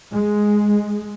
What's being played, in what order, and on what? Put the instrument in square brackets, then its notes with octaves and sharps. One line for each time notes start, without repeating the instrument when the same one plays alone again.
[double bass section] G#3